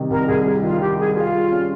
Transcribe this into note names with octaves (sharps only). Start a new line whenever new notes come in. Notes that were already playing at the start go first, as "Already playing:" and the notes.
Already playing: C3 D#3 G3
C2 A#4
C2 G#4
G3
D#3 F4
D#3 G4
G3 G#4
F4 G#4
G3
C#4